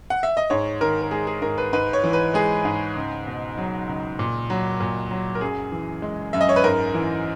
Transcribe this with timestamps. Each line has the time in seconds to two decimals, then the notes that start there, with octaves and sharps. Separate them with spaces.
0.10 F#5
0.23 E5
0.37 D#5
0.50 G#2 C#5
0.81 D#3 A#4
1.02 A#4
1.11 G#3 G#4
1.27 G#4
1.42 G#2 A#4
1.58 B4
1.73 G#2 B4
1.93 C#5
2.04 E3
2.13 B4
2.34 G#3 G#4
2.65 G#2
2.95 C#2
3.27 B2
3.58 F#3
3.88 C#2
4.19 A#2
4.50 F#3
4.80 A#2
5.11 F#3
5.35 A#4
5.41 F#2 G#4
5.72 E3
6.02 G#3
6.33 F#2 E5
6.41 D#5
6.49 C#5
6.56 B4
6.64 G#2 A#4
6.94 E3